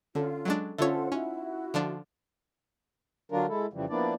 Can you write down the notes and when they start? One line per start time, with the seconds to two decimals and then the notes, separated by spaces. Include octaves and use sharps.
0.15 D3 C#4 F4 A4
0.45 F#3 G#3 D4
0.78 D3 C#4 F4 A4 C5 C#5 E5 F#5
1.12 C#4 D#4 E4 F#4
1.74 D3 F3 D4
3.32 D3 F#3 D4 F4 A#4
3.48 G#3 E4 A4
3.73 F2 C#3 E3 F3 G3
3.89 F3 A#3 B3 D4 E4 D5